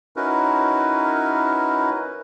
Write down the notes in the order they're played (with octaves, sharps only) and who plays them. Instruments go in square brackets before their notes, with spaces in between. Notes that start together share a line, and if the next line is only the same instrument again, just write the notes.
[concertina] C#4 D#4 E4 F#4 A#4 B4